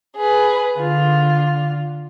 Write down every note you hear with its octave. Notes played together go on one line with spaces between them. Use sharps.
G#4 B4
D3 F4